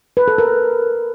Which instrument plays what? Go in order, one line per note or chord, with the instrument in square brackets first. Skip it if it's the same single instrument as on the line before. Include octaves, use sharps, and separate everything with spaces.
[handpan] B4
A4
A#4